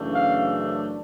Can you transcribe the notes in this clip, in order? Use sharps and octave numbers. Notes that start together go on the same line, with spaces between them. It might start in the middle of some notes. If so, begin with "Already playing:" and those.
Already playing: F#2 C#3 E3 A3 D4
F5